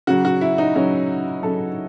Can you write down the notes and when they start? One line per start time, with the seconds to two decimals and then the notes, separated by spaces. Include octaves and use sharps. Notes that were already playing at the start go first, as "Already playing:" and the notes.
0.07 C#3 F#3 F#4
0.25 F#4
0.41 E4
0.58 D#4
0.75 C#3 F#3 C#4
1.43 C#3 F#3 A4